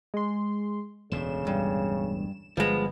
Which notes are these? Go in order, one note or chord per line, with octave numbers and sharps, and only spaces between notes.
G#3 C6
E1 D2 A2 C#3 E7
G2
G1 F3 G#3 B3